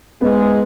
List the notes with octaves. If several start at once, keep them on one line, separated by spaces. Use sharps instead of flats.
G#2 G#3 B3